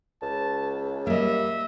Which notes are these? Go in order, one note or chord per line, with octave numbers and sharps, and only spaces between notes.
C#2 A5
G3 A#3 D#5 E5